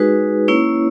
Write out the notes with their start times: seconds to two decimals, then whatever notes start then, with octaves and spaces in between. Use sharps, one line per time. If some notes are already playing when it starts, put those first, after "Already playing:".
Already playing: G#3 D#4 F#4 G#4 B4
0.48 A#3 C#4 E4 C#5